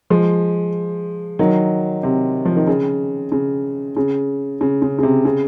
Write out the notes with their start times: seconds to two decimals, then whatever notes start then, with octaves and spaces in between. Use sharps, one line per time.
0.10 F3 G#3
1.39 D#3 F#3
2.03 C3
2.45 F3
2.56 D#3
2.67 C#3
3.32 C#3
3.97 C#3
4.61 C#3
4.82 C#3
4.99 C#3
5.03 C3
5.25 C#3